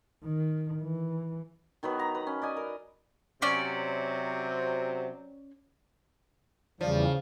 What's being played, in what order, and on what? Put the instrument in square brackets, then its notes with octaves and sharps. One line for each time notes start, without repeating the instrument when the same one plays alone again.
[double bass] D#3
E3
[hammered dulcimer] D#3 F#3 B3 B4
A#5
B4
C#4
D5 D#5 G#5
A#4
[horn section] C3 F#3 [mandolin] C#4 D5
[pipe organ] E2 E3 G3 [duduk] C#3 [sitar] F3 [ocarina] D5